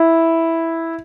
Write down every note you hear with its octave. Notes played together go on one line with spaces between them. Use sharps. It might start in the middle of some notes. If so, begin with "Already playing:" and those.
Already playing: E4